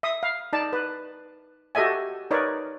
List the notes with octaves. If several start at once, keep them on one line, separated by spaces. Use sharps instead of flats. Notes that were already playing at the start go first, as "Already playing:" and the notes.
E5 D#6
F5
D#4 D5 A5
B4
F#4 G4 A4 D#5 E5 G#5
D#4 A#4 B4 C#5 D5